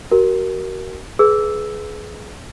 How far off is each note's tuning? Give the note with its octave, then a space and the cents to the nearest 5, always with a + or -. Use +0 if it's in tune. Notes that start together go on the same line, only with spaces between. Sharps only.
F#4 +35 A#4 +0
G#4 +25 B4 +0 E6 +0